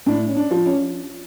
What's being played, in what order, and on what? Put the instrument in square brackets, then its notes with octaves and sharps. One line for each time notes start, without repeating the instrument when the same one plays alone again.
[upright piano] A2 D4
C#4
D4
F3
C#4